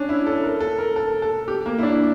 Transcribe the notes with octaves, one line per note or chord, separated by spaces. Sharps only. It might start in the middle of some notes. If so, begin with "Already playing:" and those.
Already playing: C#4 D4
E4
A4
A#4
A4
A#4
A4
A4
G4
A#3
E4
D4